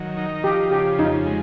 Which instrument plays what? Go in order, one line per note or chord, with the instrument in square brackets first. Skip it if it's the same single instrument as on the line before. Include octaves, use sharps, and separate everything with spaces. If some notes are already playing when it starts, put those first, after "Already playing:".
Already playing: [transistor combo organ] D#3 F#3
D#4
[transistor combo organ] F3 [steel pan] G4
[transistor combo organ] C#3 [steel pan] G4
[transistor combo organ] F2 [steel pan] D#4
[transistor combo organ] G#3